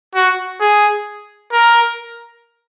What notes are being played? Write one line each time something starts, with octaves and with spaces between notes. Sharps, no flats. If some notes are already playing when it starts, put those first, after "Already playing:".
F#4
G#4
A#4